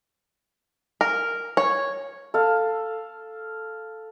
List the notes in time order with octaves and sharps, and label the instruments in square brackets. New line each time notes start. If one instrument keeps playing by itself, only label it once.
[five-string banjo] A#4
C#5
[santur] A4 F5